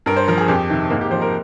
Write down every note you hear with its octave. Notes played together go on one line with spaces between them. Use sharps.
G2 A#4
C5
F3 A#4
G#4
F2 G4
C3 D#3
G#2 A#3
G4
F3 C5
A#4